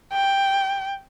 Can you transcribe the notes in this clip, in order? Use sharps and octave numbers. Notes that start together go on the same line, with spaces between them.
G5